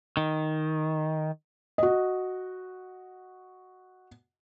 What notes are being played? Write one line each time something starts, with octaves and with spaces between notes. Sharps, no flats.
D#3
F#4 D#5